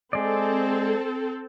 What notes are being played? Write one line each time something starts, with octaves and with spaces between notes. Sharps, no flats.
G#3 C4 A4 D5